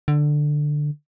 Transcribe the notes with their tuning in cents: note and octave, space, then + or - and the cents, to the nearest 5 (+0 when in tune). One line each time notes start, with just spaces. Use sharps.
D3 +10